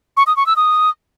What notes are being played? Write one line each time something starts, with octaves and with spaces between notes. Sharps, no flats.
C#6
D#6
C#6
E6
D#6